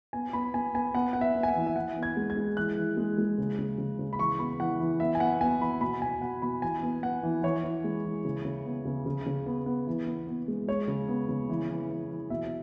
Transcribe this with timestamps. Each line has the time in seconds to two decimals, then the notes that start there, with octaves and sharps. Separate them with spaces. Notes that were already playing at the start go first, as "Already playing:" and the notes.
0.13 B3 G#5
0.33 B3 B5
0.54 B3 G#5
0.74 B3 G#5
0.95 B3 F#5
1.13 B3 F#5
1.21 E5
1.35 B3
1.43 G#5
1.48 F#5
1.55 E3
1.67 E5
1.76 E3 F#5
1.96 B3
2.03 G#6
2.17 G#3
2.30 G#6
2.37 G#3
2.57 E3 F#6
2.77 E3
2.97 G#3
3.18 G#3
3.38 C#3
3.58 C#3
3.78 C#3
3.99 C#3
4.13 B5
4.19 E3 C#6
4.39 B3 B5
4.60 E3 F#5
4.80 E3
5.00 B3 E5
5.15 G#5
5.20 B3 F#5
5.41 B3 G#5
5.61 E3 B5
5.81 B2 B5
6.02 B2 G#5
6.21 B2 F#5
6.42 B2 B5
6.62 E3 G#5
6.83 B3
7.03 B3 F#5
7.23 E3
7.43 E3 C#5
7.64 E3
7.84 G#3
8.04 E3
8.25 C#3
8.45 C#3
8.65 B3
8.85 C#3
9.06 C#3
9.26 C#3
9.46 B3
9.66 B3
9.87 E3
10.07 B3
10.27 B3
10.48 G#3
10.68 G#3 C#5
10.88 C#3
11.09 B3
11.29 C#3
11.49 E3
11.69 E3
11.90 E3
12.10 E3
12.30 B2 E5